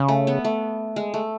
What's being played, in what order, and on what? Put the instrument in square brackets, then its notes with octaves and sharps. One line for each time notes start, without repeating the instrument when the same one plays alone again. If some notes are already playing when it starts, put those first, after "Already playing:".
Already playing: [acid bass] C#3
[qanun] A3
B3
A3
G#3
A3